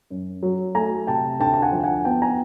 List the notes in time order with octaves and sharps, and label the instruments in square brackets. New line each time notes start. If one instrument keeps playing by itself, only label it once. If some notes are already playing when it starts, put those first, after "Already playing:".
[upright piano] F#2
F#3
A3 G#5 A#5
C3 G5 A5
D2 G5 A5
A5
F#5 G#5
F3
F#5 G#5
B3 G5 A5
G#5 A#5